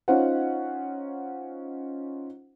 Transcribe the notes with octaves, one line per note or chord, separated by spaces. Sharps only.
C#4 D#4 F4 C5 F#5